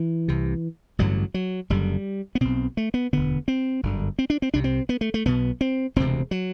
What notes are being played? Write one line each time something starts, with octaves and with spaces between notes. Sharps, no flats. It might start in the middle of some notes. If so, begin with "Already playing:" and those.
Already playing: E3
C2 C3
A1 G2 D3 F#3
F#3
F#1 F#2 D3 G3
B3
B1 B2 C4
A3
B3
E1 D2 D3 B3
C4
G1 F#2 D3
C4
D4
C4
C2 C3 D4
C4
B3
A3
A3
B1 B2 B3
C4
E1 D2 C3 C4
F#3